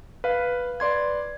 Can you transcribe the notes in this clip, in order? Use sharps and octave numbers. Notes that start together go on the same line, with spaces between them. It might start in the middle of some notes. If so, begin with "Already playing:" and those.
B4 F5
B4 D5 C6 G#6